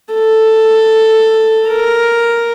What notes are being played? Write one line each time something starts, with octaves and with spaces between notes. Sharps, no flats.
A4
A#4